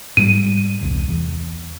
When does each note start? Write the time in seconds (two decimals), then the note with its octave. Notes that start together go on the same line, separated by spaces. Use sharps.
0.17 G#2 G3 D#7
0.81 E1 C2
1.08 E2